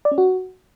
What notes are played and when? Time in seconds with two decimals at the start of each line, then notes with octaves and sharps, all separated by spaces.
0.05 D5
0.11 C#4
0.18 F#4